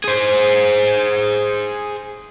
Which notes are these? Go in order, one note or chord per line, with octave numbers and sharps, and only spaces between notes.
G#4 C5